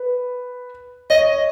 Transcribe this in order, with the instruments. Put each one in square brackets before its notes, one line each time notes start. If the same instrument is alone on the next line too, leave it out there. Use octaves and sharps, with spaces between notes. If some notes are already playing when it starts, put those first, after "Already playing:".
Already playing: [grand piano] B4
[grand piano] C#5 [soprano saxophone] D#5